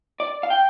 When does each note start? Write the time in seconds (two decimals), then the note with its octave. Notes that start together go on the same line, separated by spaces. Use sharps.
0.20 D5
0.43 F5
0.50 G5